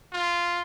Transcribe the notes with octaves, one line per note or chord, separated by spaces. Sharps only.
F4